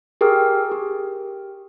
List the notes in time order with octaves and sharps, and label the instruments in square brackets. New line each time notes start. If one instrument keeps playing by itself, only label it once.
[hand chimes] G4 G#4 A#4 G5 D#6 F6
G4